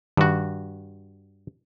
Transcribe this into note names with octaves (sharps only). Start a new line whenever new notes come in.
G2 D#3 F#4